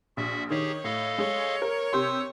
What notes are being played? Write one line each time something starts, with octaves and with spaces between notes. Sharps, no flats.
A#1 F#4 E5
D#3 D#4 G4 G#4 C#5
A2 A4 D#5 F5
G#3 C#5
A#4
C3 G4 C6 D#6 E6